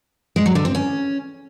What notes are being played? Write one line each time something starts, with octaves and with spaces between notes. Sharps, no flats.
G#3
F#3
D3
C4
C#4